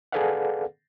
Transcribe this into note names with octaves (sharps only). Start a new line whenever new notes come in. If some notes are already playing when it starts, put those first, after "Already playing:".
G#4 A4 B4 D5 F5 F#5